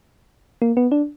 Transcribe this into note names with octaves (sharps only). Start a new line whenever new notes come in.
A#3
B3
D4